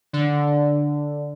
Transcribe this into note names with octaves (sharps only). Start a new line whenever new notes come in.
D3